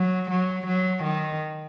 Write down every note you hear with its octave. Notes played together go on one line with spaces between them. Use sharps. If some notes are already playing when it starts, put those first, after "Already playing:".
Already playing: F#3
F#3
F#3
D#3